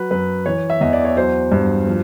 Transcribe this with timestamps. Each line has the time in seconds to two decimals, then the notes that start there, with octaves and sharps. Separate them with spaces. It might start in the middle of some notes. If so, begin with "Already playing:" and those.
Already playing: F#3 B4
0.11 F#2 B4
0.46 E3 C#5
0.70 E5
0.81 E2 D#5
0.93 D5
1.05 C#5
1.16 F#3 C5
1.52 G2
1.87 F3